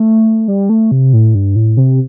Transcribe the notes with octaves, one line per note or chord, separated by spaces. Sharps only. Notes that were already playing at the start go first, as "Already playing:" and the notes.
Already playing: A3
G3
A3
C3
A2
G2
A2
C3